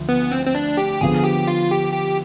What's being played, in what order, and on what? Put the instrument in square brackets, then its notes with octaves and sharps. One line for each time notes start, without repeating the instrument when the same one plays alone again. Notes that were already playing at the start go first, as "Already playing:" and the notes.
Already playing: [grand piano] D2 F3
[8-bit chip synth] B3
C4
C4
D4
G4
[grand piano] D3 F3 B3 [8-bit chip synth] G#4
[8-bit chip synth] G4
F4
G4
G4